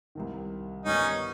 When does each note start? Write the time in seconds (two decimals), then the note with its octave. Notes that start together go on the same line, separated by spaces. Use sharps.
0.15 C2 C3 D#3
0.85 G1 G2 D#3 G3 B3 C#4 D#4